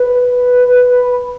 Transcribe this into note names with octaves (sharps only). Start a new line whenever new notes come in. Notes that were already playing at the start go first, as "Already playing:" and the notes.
Already playing: B4